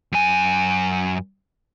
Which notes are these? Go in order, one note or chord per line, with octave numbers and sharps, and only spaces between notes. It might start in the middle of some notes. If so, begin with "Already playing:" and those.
F#2 G#5